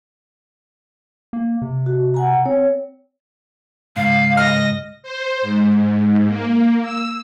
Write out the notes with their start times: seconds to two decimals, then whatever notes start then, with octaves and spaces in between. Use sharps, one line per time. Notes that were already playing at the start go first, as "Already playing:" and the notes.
1.33 A#3
1.62 C3
1.86 F#4
2.14 F#5 G#5 A#5
2.46 C4 C#5
3.96 C#2 G#2 F5
4.37 D#5 F6 A#6
5.03 C5
5.42 G#2
6.27 A#3
6.82 E6